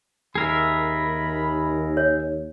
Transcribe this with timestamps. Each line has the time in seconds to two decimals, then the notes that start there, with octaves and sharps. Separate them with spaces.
0.35 D#2 G#4 A#4 E5 B5
1.97 C#5